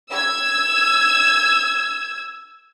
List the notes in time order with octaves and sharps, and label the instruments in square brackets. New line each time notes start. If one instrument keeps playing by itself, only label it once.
[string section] E6 G#6